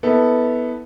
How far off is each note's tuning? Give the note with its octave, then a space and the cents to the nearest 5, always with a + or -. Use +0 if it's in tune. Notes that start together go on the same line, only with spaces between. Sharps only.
B3 +0 E4 -30 A4 +0